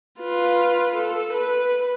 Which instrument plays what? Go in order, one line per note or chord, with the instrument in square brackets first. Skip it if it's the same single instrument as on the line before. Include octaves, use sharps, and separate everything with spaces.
[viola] F4 B4
A4
B4